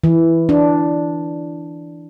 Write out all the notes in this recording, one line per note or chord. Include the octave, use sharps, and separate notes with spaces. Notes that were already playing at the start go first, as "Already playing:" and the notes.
E3
D4